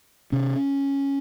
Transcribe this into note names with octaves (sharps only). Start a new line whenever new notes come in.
C3 C#4